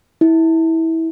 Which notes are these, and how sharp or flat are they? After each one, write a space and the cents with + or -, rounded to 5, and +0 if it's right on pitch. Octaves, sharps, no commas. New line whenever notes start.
E4 -20